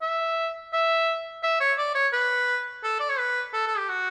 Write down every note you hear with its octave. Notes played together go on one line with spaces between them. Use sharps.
E5
E5
E5
C#5
D5
C#5
B4
A4
D5
C#5
B4
A4
A4
G4
F#4